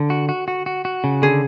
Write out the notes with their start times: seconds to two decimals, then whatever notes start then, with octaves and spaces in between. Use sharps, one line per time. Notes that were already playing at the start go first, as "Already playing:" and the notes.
Already playing: D3
0.10 F#4
0.29 F#4
0.48 F#4
0.66 F#4
0.85 F#4
1.04 C#3
1.22 D3 G#4